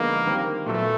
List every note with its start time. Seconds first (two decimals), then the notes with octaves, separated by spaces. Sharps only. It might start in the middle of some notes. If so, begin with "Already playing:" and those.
Already playing: D3 F3 G#3 A#3 B3 D#4
0.26 D#3 G3 C4
0.66 A#2 F#3 A3 B3